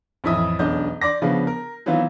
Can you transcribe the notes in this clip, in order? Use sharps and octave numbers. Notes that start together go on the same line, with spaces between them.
A1 F2 E4 D#5 E5 D#6
E1 B1 C#4 D4 D#5 G6
D5 C6 D6 A#6
C#3 F3 B3 C#4 D4
A#4
D#3 E3 F#3 B3 C4 F4